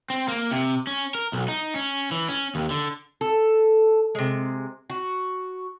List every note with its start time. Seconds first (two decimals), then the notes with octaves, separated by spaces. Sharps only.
0.10 C4
0.28 A#3
0.51 C3
0.87 C#4
1.15 A#4
1.33 B1
1.48 D#4
1.76 C#4
2.11 E3
2.29 C#4
2.55 D#2
2.70 D3
3.21 A4
4.15 C3 G#3
4.90 F#4